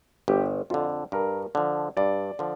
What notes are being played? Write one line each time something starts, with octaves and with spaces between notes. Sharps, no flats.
G1 G4
F2 D3 F4
G2 A#4
D3 F3
G2 D5
D3 F3